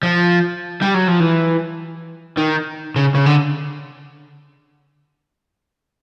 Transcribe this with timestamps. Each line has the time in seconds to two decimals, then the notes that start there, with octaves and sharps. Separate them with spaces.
0.03 F3
0.82 G3
0.94 F#3
1.08 F3
1.20 E3
2.37 D#3
2.96 C#3
3.15 C#3
3.26 D3